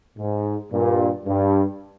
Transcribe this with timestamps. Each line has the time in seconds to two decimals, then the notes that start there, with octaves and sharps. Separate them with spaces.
0.18 G#2
0.72 G2 A#2
1.26 G2